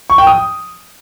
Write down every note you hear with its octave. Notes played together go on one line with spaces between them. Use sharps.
C#6
G5
D#6